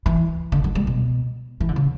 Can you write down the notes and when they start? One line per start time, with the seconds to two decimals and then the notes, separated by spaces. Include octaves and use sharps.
0.06 E3
0.52 D3
0.64 F#3
0.75 G3
0.87 B2
1.60 E3
1.69 D3
1.76 C#3